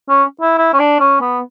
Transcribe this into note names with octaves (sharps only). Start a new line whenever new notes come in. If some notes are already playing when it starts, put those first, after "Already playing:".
C#4
E4
E4
C#4
D4
C#4
B3